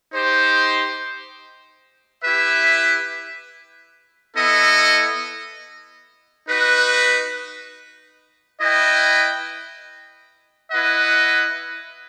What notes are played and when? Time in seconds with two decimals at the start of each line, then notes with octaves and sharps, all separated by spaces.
0.12 D#4 G4 C5
2.24 E4 G4 B4 E5
4.36 B3 E4 A4 D#5
6.47 D#4 F#4 B4
8.59 E4 B4 D#5 G5
10.71 E4 B4 D#5 F#5